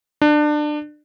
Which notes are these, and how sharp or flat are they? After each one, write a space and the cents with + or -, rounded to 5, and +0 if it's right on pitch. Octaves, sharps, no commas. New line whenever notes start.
D4 +25